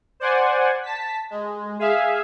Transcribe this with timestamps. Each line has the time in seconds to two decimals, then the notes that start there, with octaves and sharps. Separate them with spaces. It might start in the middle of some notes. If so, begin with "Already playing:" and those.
0.20 C5 D5 F#5 G#5
0.83 A5 B6
1.30 G#3
1.79 G#4 E5 F5